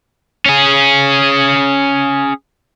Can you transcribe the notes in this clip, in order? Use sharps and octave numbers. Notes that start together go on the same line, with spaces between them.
C#4 G#4